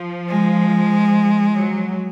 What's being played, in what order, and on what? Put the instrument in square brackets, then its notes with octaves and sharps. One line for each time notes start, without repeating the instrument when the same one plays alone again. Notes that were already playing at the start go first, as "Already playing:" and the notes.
Already playing: [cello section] F3
[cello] G#3
[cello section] F#3